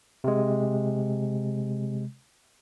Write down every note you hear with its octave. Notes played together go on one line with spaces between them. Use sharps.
C3 G#3